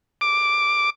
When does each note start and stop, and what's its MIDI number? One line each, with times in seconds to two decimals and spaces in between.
0.21 0.90 86